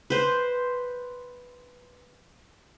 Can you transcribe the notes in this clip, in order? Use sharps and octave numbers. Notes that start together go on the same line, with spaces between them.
B4 C5